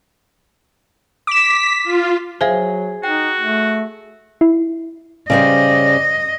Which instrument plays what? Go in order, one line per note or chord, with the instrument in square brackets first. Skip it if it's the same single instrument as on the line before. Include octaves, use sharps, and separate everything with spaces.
[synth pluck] D6 E7 [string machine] B6
[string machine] F4
[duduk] F#3 [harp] G#4 [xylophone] C5 E5 F5
[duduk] D#4 [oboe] F#4 [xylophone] G5
[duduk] A3
[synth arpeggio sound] E4
[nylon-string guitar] C#3 G3 C5 [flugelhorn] D5 [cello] D#5